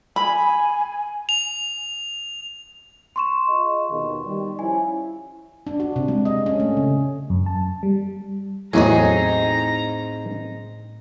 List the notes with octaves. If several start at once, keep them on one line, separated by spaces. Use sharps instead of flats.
G#5 B5
F7
C6 C#6 E7
F4 G#4 D#5
D#2 B2 D#3
D#3 G3
F3 C#4 E4 G#5
D4
F#4
C3
G#3
D#5
C#4
A3
C#3
F#2
A5
G3
A1 E2 A2 F#3 C4 D#4 G#4 A#5